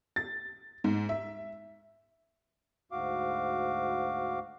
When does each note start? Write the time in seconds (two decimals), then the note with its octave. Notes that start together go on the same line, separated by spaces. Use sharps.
0.16 A6
0.84 G#2
1.09 E5
2.92 D2 G#2 F#4 F5 D6